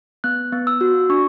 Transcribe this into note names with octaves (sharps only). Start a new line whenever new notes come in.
B3 F#6
B3
E6
F#4
D4 C#6